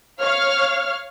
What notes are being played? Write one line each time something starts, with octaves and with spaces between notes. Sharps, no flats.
C#5 F5 F6